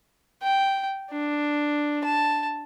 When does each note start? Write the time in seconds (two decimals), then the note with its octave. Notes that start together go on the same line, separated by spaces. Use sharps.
0.42 G5
1.11 D4
2.04 A5